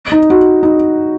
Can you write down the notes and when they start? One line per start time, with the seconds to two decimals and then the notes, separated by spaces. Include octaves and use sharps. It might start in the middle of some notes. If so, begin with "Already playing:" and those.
0.12 D#4
0.30 F#4
0.63 D#4